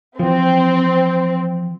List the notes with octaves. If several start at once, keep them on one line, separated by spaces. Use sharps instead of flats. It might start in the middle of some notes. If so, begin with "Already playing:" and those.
E3 F3 C4